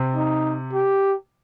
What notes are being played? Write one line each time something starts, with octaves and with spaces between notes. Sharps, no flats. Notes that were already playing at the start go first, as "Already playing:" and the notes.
Already playing: C3
D#4
G4